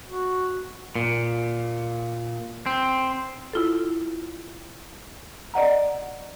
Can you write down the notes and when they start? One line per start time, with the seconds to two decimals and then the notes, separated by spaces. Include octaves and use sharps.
0.07 F#4
0.95 A#2
2.66 C4
3.53 E4 F4 A4
5.54 D5 D#5 F#5 A#5